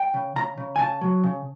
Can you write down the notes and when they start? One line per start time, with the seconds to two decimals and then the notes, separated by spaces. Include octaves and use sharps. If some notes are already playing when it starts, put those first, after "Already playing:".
Already playing: G5
0.14 C#3
0.36 C#3 A#5
0.58 C#3
0.76 G#5
0.79 C#3 A5
1.01 F#3
1.24 C#3